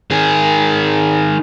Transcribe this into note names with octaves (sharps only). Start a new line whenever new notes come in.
D#3 G#4